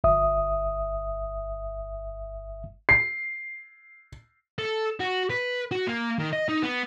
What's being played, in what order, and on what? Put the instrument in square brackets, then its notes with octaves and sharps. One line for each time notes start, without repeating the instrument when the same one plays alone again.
[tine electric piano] G1 E5 D#6
[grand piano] C7
[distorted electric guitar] A4
F#4
B4
F#4
A#3
D#3
D#5
D#4
B3